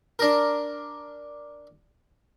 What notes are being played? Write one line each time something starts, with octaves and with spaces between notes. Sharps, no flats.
D4 A#4